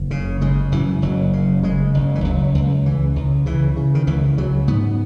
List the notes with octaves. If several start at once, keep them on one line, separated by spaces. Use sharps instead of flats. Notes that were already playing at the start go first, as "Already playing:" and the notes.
Already playing: F#1
C#3
C#3 G#3
F#2 E3
F#1 F#3
C#3
C#3 G#3
F#1
E3
C#2 F#3
C#2
C#3 E3
C#2
C#3 E3
C#3
D#3
C#2 E3
C#3 F#3
G#2 B3